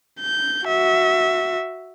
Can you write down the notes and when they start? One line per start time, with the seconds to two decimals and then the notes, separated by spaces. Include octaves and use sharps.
0.20 G6
0.65 F#4 E5